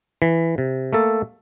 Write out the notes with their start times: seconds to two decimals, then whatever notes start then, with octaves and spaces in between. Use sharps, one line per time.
0.22 E3
0.58 C3
0.93 A3 A#3 A4